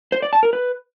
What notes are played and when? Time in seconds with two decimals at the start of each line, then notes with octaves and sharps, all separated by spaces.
0.12 C5
0.22 D5
0.33 A5
0.43 A#4
0.53 B4